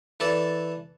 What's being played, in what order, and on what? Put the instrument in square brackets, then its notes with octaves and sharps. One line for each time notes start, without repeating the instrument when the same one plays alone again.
[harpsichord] E3 A4 D5